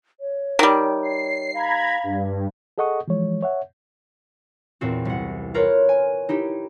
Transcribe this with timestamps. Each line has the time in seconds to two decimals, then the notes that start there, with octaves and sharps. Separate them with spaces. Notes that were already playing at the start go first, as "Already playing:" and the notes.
0.20 C#5
0.59 D#3 G3
1.03 C7
1.54 F5 A#5 B5 G#6
2.03 G2
2.78 G#4 A4 D#5 F#5 C#6 D#6
3.08 E3 F3 G#3 C#5
3.43 C#5 E5 F#5
4.81 E2 A#2 C4 F#4
5.05 C2 F#5
5.54 F4 A#4 B4 C#5
5.89 G#5
6.29 D#4 E4 G4